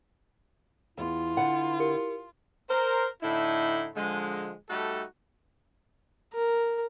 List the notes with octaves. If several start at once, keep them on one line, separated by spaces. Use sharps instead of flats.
E2 B3 E4 F4
D3 B4 F#5
G4 A#4 C#7
A#4 C5
A2 D3 D#4 E4
D3 F3 G#3
G3 A3 D#4 F#4 A4
A#4